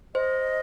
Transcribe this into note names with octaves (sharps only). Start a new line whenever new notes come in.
C5 D#5